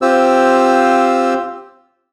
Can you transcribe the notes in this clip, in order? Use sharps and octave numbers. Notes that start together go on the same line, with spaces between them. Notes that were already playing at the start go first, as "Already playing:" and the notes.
C4 F4 G4 C5 E6